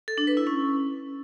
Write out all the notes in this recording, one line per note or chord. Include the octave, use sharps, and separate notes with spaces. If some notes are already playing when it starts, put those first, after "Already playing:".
A4
D4
B4
E4
C#4